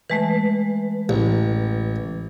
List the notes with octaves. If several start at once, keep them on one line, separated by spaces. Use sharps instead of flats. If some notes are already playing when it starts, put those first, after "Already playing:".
E3 G#3 A3 B4
A1